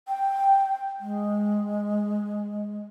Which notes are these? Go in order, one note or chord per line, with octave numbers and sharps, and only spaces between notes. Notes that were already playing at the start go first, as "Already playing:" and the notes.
G5
G#3